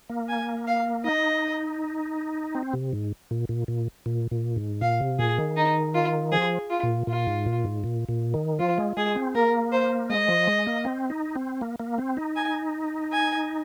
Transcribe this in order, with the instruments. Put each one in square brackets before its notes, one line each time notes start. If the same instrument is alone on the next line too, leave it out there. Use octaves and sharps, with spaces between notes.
[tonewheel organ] A#3
[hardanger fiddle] G#5
F5
[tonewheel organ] D#4 [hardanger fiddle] D#5
[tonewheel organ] C4
C3
G#2
A#2
A#2
A#2
A#2
A#2
G#2
[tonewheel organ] A#2 [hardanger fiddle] F5
[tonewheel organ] C3
[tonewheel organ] A#2 [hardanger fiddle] G#4
[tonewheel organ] D#3
[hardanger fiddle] D#4
F4
[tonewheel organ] F3 [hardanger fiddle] G#4
[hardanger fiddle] F4
[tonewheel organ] A#2
[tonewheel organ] A#2 [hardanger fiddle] F4
[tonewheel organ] G#2
A#2
G#2
A#2
A#2
D#3
[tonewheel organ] F3 [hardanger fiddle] F4
[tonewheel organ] G#3
[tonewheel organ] G#3 [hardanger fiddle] G#4
[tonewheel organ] C4
[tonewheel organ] A#3 [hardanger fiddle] A#4
[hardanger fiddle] C5
[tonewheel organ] G#3 [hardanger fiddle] D#5
[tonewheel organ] F3
G#3
A#3
C4
D#4
C4
A#3
A#3
C4
D#4
[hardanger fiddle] G#5
G#5